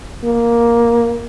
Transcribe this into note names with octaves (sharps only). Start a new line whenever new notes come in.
A#3